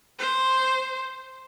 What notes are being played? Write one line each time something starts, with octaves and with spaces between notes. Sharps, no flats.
C5